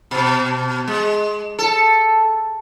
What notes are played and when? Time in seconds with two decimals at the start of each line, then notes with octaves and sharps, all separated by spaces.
0.11 B2
0.88 G#3
1.59 A4